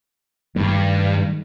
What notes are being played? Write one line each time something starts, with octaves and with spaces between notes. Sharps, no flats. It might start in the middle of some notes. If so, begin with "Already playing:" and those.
G2 D#3 G3 A3